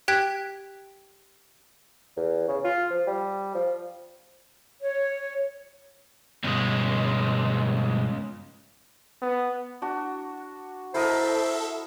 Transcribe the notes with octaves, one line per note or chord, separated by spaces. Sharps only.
G4 G5 F#6 G#6 B6
E2
C#3
F4
F3
G3
F3
C#5
C#2 G2 B2 G#3
B3
D4 F#4
E4 A4 A#4 C5 D#5 E5